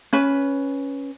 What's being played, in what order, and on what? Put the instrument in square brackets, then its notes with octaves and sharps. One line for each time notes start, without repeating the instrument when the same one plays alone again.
[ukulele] C#4 B4